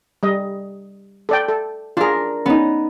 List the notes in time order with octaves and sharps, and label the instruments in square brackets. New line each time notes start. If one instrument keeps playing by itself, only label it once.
[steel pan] G3 D#5
A4 D5 G5
A4
[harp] D4 A#4 [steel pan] F4 G#4
[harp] B3 D#4 [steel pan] C#4